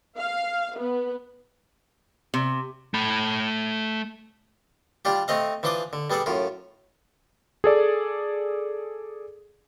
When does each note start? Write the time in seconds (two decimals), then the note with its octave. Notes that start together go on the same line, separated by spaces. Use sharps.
0.19 F5
0.78 B3
2.34 C3
2.94 A3 B5
5.05 G3 D4 F4 G4
5.28 A3 C4 D#5 F5
5.63 E3 F3 D4 C6 D6 D#6
5.93 D3
6.10 G3 B3 G#4 A4 D5
6.26 F#2 A2 F4
7.64 G#4 A4 D5